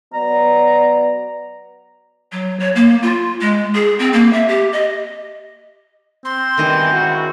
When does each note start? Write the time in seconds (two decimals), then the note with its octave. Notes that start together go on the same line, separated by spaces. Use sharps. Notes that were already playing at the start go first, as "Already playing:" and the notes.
0.14 F#3 B3 D5 A#5
2.32 F#3
2.60 C#5
2.76 A#3
3.03 F4
3.41 G#3
3.75 G#4
3.99 C4
4.13 A#3
4.33 E5
4.48 G4
4.73 D#5
6.25 C4 C6
6.58 G2 B2 D#3 E3 D#5
6.92 C#2 E4 F#4